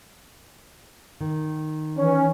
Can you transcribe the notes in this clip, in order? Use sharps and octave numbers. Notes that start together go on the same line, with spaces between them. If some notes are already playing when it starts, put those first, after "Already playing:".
D#3
E3 C#4